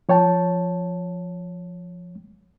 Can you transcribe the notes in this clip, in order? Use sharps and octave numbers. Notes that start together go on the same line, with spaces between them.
F3 C#5 G5 A5